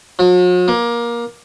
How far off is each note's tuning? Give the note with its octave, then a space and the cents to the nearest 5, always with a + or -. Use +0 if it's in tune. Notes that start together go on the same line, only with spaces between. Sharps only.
F#3 -45
A#3 +20